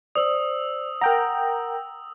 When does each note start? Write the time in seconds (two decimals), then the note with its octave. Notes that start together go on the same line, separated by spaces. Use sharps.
0.15 C5 D5 D#6 E6
1.01 A#4 F#5 G5 A#5